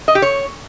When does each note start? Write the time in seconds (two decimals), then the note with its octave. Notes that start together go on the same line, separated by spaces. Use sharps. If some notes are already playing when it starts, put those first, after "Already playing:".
0.08 D#5
0.15 G4
0.22 C#5